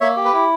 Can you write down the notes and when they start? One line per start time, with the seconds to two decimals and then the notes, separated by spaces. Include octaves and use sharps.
0.01 A#3 C#5 E5
0.16 G4
0.25 B4
0.33 E4